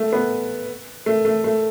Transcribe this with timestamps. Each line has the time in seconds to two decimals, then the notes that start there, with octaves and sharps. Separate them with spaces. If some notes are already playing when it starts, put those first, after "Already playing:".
Already playing: A3
0.13 B3
1.06 A3
1.25 A3
1.44 A3